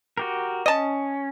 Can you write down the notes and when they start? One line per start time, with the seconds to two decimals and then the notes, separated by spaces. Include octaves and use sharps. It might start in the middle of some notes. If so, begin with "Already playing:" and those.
0.18 F#4 G4 A#4
0.66 C#4 D#5 A5